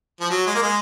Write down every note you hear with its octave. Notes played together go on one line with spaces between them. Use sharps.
F3
F#3
G#3
A#3
G#3